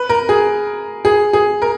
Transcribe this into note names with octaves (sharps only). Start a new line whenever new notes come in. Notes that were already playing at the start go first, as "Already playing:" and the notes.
Already playing: B4
A#4
G#4
G#4
G#4
A#4